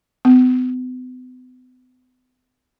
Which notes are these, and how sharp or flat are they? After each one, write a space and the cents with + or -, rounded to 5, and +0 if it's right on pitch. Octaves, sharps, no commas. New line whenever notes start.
B3 +40